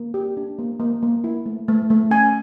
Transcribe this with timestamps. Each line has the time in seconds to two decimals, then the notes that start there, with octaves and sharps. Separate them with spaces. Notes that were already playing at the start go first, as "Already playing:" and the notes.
Already playing: A#3
0.14 G4
0.37 D4
0.59 A#3
0.80 A#3
1.03 A#3
1.24 E4
1.46 A3
1.68 A3
1.90 A3
2.11 C#4 G#5